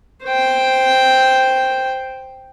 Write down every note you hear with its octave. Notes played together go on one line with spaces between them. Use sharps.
C5 G5